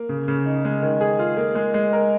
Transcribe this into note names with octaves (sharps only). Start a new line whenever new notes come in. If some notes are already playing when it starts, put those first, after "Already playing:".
Already playing: A#3
C#3
C#3
D#4
G#3
D#3
G#4
F4
A#3
G#3
G#3
A#4